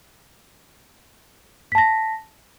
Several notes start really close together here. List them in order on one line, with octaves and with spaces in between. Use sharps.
B6 A5 A#6